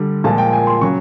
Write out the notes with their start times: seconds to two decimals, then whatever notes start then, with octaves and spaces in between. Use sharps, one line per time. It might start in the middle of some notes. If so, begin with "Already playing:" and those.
Already playing: D3 G3
0.24 A#2 F3 G#3 A5
0.38 G5
0.53 G#5
0.67 C6
0.81 C#3 F#3 C#6